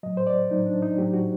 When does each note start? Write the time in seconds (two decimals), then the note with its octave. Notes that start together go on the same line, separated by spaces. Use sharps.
0.03 A2 F#3 D#5
0.17 C5
0.27 D5
0.50 A2 F#3 D#4
0.66 D4
0.82 D#4
0.97 A2 F#3 G4
1.13 F#4